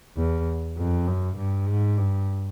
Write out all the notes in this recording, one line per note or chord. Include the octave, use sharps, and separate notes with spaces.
E2
F2
F#2
G2
G#2
G2